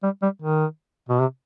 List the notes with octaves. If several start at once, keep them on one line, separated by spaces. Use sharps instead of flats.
G3
G3
D#3
B2
C3